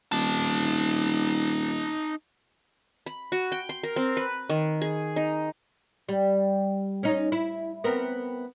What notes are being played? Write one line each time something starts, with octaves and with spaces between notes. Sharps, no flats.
D#1 D#4 A5
B5
F#4
G5
C6
A#4
C4
B4
D#3
G#4
D#4
G3
C#4 D#4
E4
B3 C4 A#4